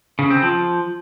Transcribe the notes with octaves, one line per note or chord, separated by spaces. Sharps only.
C#3
C4
F3